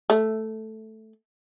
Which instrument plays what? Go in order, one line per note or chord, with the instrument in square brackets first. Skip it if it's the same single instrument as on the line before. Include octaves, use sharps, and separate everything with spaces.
[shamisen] A3